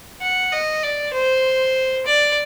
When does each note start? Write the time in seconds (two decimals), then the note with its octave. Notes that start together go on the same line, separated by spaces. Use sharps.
0.21 F#5
0.52 D#5
0.83 D5
1.13 C5
2.06 D5